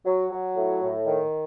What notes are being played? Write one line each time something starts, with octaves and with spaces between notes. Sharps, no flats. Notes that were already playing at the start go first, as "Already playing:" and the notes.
F#3
F#3
A2
A2
D#3